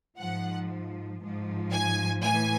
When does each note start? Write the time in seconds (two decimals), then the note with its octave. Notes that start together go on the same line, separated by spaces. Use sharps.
0.18 G#2 F3 F#5
1.21 G#2 F3
1.71 G#5
2.23 A2 E3 G#5